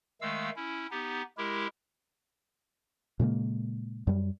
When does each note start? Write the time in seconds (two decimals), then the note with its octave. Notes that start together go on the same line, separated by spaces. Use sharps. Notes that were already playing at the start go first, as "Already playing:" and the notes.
0.21 D#3 G#3 A3 F5 E6
0.56 C#4 E4
0.91 B3 D#4 G4
1.38 G#3 E4 G4 A#4
3.20 A#2 C#3 G#3 A#3
4.07 F#2 G3